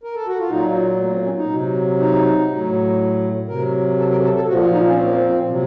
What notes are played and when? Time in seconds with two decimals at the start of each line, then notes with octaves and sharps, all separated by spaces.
0.04 A#4
0.15 A4
0.27 F#4
0.39 F4
0.49 A#2 F#3 D#4
1.00 A3
1.06 A#3
1.12 C4
1.24 C#4
1.37 D#4
1.50 C3 F#3
1.99 D#4
2.48 A2 F#3
3.48 C3 F#3 A#4
3.98 A4
4.11 A#4
4.24 A4
4.35 A4
4.48 A#2 F3 F#4
4.61 F4
4.73 D#4
4.86 C#4
4.95 C4
5.05 A#3
5.14 C4
5.48 C3 F#3